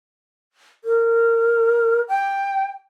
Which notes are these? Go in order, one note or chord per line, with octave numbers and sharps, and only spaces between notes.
A#4
G5